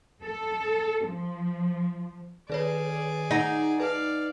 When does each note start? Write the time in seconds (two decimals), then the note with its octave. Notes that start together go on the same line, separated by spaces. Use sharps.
0.24 A4
1.06 F3
2.50 D#3 G#4 B4 C#5 D5
3.31 D#4 D#5 F#5 A#5
3.80 B4 D5 F5